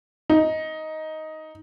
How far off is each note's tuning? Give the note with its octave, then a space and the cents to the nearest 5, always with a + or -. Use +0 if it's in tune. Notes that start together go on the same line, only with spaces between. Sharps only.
D#4 +10